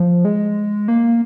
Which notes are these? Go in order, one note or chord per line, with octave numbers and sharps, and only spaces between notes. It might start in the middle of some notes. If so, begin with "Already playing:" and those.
Already playing: F3
G#3
A#3